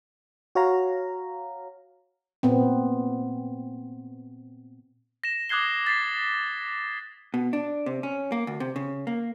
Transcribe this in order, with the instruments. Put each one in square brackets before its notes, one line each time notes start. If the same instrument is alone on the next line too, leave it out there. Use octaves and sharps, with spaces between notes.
[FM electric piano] F#4 C#5 F5 A#5
[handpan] A#2 B3 C4
[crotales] A#6 E7
D6 D#6 F#6 G#6 C7 G7
A6 B6 C7
[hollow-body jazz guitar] B2
D4
C3
C#4
A#3
D2
C3
C#3
A#3